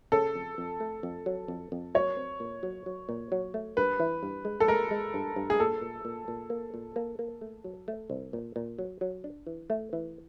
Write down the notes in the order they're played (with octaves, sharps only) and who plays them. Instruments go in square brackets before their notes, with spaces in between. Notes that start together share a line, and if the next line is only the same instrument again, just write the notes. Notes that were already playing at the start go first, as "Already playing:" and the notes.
[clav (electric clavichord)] C#3 [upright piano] A4
[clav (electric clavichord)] F2
F2
A3
F2
F#3
F2
F2
[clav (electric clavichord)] F#3 [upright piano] C#5
[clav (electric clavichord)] C4
A#2
F#3
F#3
A#2
F#3
A3
[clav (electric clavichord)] G2 [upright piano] B4
[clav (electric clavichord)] E3
G2
G#3
[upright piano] A4
[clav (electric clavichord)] G#3 [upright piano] A#4
[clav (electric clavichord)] G#3
G2
G2
[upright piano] G#4
[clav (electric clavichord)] A#2 [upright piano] A4
[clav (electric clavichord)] A#2
A#2
A#2
A#3
A#2
A#3
A#3
A3
F#3
A3
C2
A#2
A#2
F#3
F#3
D4
E3
A3
E3